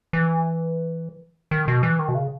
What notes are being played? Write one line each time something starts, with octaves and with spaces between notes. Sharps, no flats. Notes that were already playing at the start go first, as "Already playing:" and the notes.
E3
D#3
B2
E3
D#3
B2
C#3